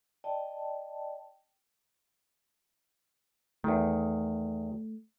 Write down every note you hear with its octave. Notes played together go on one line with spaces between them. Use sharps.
D5 D#5 G5 A5
E2 D#3 A3